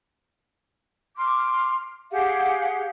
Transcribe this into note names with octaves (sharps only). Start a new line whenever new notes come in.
C6 D6 F6
G4 G#4 F5 F#5